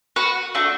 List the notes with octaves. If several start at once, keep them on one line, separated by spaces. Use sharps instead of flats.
F#4 B4 F#5
A3 D4 F#4